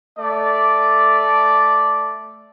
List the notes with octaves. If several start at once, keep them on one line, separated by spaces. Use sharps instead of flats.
A3 D5